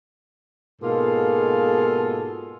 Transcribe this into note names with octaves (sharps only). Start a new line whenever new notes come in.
G#2 B2 A#3 F4 G#4 A4